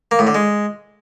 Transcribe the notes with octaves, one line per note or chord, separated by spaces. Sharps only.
A#3
A2
D3
G#3